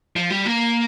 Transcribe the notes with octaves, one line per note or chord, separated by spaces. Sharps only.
F3
G3
A#3